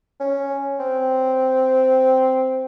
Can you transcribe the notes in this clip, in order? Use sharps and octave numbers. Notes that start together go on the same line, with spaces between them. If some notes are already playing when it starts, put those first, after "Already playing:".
C#4
C4